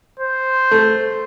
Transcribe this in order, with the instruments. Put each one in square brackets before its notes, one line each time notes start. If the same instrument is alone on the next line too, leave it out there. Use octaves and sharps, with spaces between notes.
[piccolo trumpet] C5
[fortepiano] A3